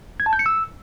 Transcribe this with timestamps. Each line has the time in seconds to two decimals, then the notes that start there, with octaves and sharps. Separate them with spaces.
0.20 G#6
0.26 A5
0.33 G6
0.39 C#7
0.46 E6